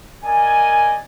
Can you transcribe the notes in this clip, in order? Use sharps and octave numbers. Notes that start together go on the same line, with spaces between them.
A#4 D5 D#5 G#5